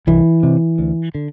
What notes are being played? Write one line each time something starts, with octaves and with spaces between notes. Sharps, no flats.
C2 E3
C3
D2
D3